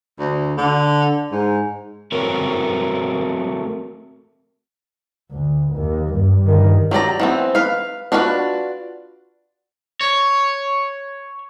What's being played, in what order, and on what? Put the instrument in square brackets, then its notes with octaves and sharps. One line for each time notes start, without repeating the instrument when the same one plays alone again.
[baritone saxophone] D2
D3
G#2
[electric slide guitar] A3 C4 F#4 A#4 B4 C#5
[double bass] D2
D#2
G2
G2 D#3
[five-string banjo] F#3 G4 D5 A#5
E3 B3 C4
B4 F5
D4 F4 F#4 A#4 B4
[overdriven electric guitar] C#5